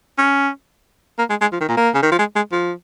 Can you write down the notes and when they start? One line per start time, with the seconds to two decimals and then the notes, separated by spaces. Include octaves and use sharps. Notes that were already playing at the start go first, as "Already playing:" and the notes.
0.18 C#4
1.19 A#3
1.30 G#3
1.41 G#3
1.52 F3
1.60 D#3
1.69 A#2
1.77 A#3
1.94 C#3
2.02 D#3
2.12 F3
2.19 G#3
2.36 G#3
2.52 F3